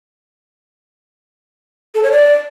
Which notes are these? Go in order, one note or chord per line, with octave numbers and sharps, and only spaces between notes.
A4
C#5
D5